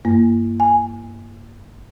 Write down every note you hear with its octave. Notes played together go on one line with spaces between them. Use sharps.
G2 A#3
G#5